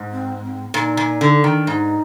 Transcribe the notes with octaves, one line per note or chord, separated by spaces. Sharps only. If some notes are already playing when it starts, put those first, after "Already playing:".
Already playing: G#2
C4
C4
A#2 D#4
A#2
D3
D#3
G#2 D#4